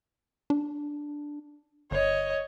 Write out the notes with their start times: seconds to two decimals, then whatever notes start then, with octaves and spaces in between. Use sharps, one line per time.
0.50 D4
1.91 G1 C#5 D#5